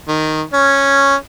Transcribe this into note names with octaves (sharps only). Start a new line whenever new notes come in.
D#3
C#4